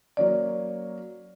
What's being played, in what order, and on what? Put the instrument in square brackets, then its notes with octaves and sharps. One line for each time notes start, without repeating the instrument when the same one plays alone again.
[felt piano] F#3 A#3 C#4 [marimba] D5